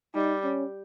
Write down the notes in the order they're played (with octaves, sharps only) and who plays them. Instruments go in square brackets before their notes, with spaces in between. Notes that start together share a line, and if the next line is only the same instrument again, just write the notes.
[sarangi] G3 [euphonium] D#4
[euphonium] C#4